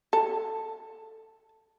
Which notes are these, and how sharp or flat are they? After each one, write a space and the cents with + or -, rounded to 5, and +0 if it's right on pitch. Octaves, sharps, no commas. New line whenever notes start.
A4 +0